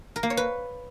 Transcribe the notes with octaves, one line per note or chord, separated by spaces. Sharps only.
A#4
A#3
C#5
B4